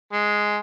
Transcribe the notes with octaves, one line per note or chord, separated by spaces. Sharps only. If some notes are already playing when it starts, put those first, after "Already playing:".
G#3